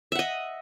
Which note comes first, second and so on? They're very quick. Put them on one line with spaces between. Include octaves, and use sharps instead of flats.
E5 F#5 D#5